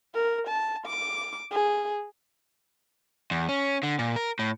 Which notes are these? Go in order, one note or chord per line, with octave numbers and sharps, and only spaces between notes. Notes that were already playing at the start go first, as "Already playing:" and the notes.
A#4
A5
D6
G#4
E2
C#4
D3
A#2
A#4
A2